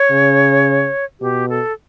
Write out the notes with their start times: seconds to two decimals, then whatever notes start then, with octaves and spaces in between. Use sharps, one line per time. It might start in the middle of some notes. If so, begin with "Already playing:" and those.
Already playing: C#5
0.11 C#3
1.21 B2 G4
1.49 A4